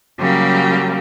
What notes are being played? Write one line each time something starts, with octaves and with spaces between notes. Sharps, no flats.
C#3 F#3 G3 A#3 G4